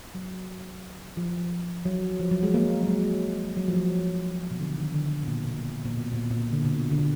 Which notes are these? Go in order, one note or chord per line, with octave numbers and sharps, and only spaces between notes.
F#3
F3
F#3
F3
F#3
G#3
A#3
F#3
G#3
F#3
F3
F#3
B2
D3
D#3
D3
B2
A#2
B2
A#2
B2
A#2
A#2
D3
B2
D3
B2